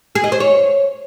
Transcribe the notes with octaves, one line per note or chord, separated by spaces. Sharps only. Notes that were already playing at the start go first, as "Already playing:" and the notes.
G#4
D#5
C5
C#5